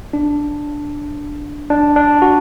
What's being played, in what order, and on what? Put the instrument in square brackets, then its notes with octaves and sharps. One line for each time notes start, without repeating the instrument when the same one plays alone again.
[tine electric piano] D4
D4
D4
F#4